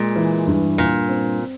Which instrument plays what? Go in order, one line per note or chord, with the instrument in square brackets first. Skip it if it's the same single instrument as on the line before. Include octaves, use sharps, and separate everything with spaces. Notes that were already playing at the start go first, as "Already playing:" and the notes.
Already playing: [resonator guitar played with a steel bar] A#2 [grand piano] G#3
[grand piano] E3
G2
[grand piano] G2 [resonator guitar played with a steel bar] A#2
[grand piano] C4